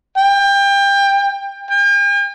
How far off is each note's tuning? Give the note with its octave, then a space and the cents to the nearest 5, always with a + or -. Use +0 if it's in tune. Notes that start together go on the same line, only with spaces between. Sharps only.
G5 +25
G5 +45